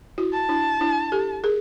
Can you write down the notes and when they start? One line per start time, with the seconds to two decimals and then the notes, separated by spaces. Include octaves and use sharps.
0.18 E4 F#4
0.33 A5
0.49 D4 E4
0.81 D4 E4
1.12 G4 A4
1.44 G#4 A#4